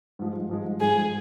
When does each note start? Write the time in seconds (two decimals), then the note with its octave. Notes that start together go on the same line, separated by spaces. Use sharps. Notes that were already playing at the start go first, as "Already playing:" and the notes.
0.19 G#2 F3 G#3
0.49 G#2 F3 G#3
0.80 G#2 F3 G#3 G#4